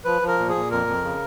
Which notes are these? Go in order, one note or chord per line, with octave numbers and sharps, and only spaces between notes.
F3 B4
F3
A#4
A#2
G#4
A#2
F2 A#4
F2
C#3